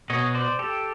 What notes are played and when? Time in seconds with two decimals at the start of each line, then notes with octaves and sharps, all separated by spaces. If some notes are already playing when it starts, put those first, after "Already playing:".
0.10 B2 C#5 D#5
0.35 C5 D5
0.59 G4 A4